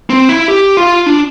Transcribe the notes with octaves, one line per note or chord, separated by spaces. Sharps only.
C4
E4
G4
F4
D4